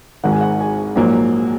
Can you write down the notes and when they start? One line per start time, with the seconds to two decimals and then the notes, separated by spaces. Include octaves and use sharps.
0.24 G#1 G#2 D#3 G#3 F#5
0.32 G#5
0.41 F#5
0.60 G#5
0.96 A#1 G#2 F#3 A#3